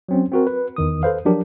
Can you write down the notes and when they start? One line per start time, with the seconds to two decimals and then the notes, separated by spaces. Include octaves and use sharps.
0.09 F#3 C4 C#4
0.32 C4 F#4 A#4
0.47 B4
0.76 E2 D#3 D#6
1.03 A4 B4 C5 F5
1.25 F3 F#3 D4 G4 A#4